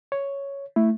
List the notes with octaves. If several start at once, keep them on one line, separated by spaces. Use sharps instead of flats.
C#5
A3 E4